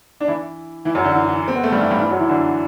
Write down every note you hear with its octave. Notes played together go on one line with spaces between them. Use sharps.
D4
E3 E4
E3 E4
F#2 F#3
D3
E3
E3
C4
B3
A3
G2 G3
E3 E4
G2 G3
E3
F#2 F#3
E3 E4
D3 D4